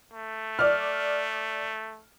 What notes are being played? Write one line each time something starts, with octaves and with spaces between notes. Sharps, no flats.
A3
D5 F6